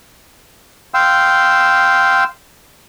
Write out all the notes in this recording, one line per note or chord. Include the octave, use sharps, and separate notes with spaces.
F5 G5 C6 E6